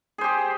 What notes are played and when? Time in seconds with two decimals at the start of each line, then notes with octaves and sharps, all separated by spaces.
0.18 G#4
0.21 C5
0.24 G4